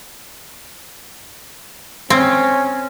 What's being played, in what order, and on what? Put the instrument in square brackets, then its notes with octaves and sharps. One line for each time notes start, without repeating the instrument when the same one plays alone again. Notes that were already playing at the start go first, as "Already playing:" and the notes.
[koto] C4 [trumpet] C#4